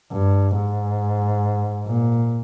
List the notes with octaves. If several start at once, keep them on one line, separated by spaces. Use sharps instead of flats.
G2
G#2
A#2